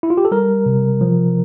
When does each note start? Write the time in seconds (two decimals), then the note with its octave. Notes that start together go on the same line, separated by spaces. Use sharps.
0.03 E4
0.10 F4
0.17 G4
0.25 A4
0.31 G3 A#4
0.66 C3
1.01 F3